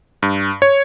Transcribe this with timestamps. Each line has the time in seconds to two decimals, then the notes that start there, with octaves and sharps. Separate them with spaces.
0.23 G2
0.62 C#5